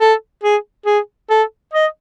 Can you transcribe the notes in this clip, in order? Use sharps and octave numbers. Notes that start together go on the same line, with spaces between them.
A4
G#4
G#4
A4
D#5